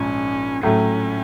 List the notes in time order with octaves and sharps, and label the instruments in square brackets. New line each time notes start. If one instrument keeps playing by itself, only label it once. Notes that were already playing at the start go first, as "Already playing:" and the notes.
Already playing: [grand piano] A#1 G#2 F3 [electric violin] C#4
[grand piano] A2 F#3 A3 [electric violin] C#4